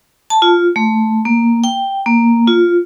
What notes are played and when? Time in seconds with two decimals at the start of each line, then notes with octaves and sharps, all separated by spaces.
0.30 A5
0.42 F4
0.76 A3
1.25 A#3
1.64 G5
2.06 A#3
2.48 F4